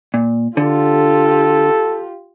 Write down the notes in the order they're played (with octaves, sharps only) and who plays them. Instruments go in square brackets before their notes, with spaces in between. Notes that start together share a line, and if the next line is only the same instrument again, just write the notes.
[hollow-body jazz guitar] A#2
[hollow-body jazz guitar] D3 [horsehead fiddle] F4 G4 [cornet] A4